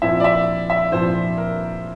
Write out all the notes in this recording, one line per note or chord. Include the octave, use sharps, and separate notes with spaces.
A#1 A#2 F3 C4 E4 E5
D5
E5
E5
A#1 A#2 F3 C4 E4 C5
A#4